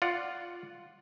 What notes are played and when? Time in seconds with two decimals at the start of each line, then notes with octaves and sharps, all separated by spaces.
0.02 F4 D5 F#5